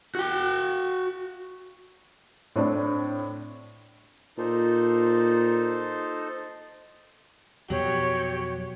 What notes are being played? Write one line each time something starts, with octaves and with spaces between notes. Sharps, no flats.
F#4 G5
A2 C4 D4
A#2 D#4 A4 C5
F2 B2 F#3 G4 C#5